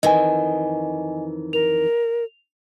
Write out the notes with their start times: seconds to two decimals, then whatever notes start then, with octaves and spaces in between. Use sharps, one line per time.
0.03 F2 D#3 E3 D#5 G#5
1.53 A#4 F7